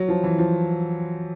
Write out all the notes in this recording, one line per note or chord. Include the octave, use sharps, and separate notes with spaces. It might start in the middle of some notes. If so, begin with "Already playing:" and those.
Already playing: F#3
F3
E3
F3